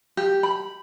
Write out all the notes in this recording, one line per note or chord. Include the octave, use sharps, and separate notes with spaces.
G4
B5